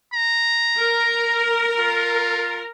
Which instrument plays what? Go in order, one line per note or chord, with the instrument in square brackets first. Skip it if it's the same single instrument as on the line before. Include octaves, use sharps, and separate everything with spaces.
[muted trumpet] A#5
[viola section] A#4
[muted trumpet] F4